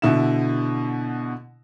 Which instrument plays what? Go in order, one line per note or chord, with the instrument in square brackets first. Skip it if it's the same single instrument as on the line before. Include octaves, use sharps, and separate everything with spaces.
[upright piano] B2 D3 E4 E7